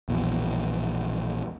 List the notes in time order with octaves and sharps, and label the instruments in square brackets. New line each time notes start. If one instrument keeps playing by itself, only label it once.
[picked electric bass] A#1 E2 B2